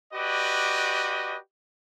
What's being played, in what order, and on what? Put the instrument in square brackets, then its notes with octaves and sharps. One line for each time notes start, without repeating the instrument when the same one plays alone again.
[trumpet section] F#4 G4 B4 D5 D#5